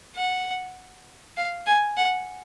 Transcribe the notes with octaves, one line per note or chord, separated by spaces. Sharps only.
F#5
F5
G#5
F#5